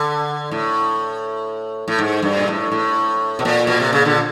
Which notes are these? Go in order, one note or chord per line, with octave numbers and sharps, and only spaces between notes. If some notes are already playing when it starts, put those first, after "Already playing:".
Already playing: D3
A2
A2
G#2
G2
A#2
A2
A2
B2
A#2
B2
C3
C#3
D3